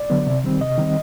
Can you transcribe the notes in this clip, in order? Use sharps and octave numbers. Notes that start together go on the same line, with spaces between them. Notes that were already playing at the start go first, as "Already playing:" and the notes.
Already playing: D5
D3 F#3 B3
C3
D#3 G3 C4
C3 D#5
D#3 G3 C4